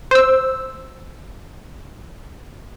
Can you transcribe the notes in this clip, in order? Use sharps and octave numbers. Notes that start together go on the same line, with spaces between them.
C5 E6